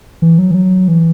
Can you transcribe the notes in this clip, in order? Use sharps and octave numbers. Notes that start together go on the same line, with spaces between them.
E3
F#3
E3
F#3
E3